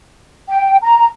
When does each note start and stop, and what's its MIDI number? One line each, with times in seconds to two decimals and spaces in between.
0.49 0.76 79
0.83 1.06 82